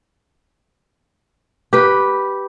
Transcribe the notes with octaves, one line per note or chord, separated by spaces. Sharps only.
G4 B4